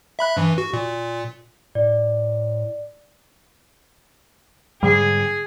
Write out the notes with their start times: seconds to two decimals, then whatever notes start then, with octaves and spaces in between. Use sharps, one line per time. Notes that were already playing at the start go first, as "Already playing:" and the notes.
0.19 E5 B5 F#6
0.37 G2 E3
0.58 F#4
0.73 A#2
1.75 A2 D5
4.83 G#2 D3 G3 G#4